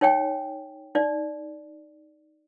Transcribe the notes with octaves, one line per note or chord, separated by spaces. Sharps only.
D#4 C#5 G5 G#5
D#4 D5